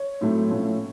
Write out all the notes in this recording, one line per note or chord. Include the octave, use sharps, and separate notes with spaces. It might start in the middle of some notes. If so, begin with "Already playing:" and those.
Already playing: C#5
A2 F#3 A3 C4
A2 F3 A3 C#4